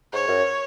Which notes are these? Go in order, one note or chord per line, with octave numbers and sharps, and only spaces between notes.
G#2 C#5
F#2